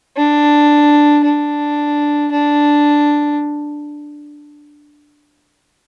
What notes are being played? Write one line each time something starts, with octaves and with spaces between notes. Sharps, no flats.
D4
D4
D4